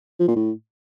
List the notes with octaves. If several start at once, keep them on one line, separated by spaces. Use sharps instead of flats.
F3
A#2
A2